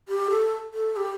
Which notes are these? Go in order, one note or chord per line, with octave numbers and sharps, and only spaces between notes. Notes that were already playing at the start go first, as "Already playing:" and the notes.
G4
A4
A4
G4